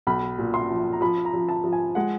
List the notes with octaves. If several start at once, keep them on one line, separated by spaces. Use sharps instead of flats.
B1 B5
A#2
C6
F3
A#5
F3 B5
A#5
F3
A5
F3
G#5
G#3 F#5